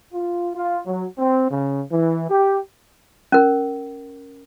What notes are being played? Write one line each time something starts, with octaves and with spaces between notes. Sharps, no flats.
F4
F4
F#3
C4
C#3
E3
G4
C#4 A#4